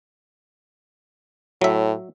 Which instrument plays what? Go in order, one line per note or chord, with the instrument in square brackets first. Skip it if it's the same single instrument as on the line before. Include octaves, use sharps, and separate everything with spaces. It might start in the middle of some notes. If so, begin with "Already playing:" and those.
[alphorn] A2 [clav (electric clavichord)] F#3 E5